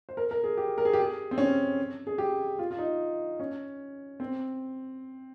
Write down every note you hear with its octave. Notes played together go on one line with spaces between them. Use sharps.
C5
A#4
A#4
G#4
G4
A#4
G#4
G4
G#4
C4
C#4
G#4
G4
F4
F4
D#4
C#4
C4